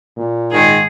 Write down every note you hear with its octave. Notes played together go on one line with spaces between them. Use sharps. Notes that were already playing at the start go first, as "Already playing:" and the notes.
A#2
G#2 D#3 G#4